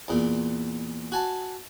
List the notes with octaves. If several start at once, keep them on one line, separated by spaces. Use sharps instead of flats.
E2 A#2
F#4 G#5 A5